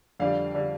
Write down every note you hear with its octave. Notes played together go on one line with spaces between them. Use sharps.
F2 D3 G3 D4 F5
D3 G3 D4